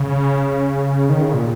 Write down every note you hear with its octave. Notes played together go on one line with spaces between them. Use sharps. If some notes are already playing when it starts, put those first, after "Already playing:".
Already playing: C#3
D#3
C#3
A#2